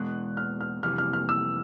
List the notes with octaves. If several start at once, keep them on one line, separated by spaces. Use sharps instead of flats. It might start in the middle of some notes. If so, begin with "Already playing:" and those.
Already playing: E2 B2 G#3 F#6
F6
F6
F2 C3 E3 G3 F6
F6
F6
E6